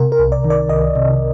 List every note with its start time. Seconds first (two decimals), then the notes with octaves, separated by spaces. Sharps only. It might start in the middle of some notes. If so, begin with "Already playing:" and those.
Already playing: C3 A#4
0.12 A#4
0.19 C2
0.32 D5
0.44 D#3
0.50 D5
0.69 C2 D#5
0.96 C3